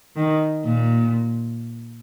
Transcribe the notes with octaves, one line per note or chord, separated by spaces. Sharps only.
D#3
A#2